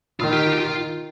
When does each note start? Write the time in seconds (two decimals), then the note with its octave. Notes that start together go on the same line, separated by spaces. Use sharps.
0.20 D#3 F4
0.33 G4
0.47 F4
0.54 G4
0.60 F4